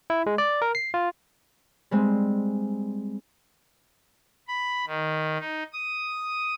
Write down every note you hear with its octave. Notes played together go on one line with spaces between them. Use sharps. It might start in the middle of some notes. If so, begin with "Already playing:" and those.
E4
G#3
D5
A#4
C7
F4
G3 G#3 C4
B5
D#3
D#4
D#6